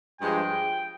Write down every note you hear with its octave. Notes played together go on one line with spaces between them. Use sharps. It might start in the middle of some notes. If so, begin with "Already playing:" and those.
G2 F3 G#3 G5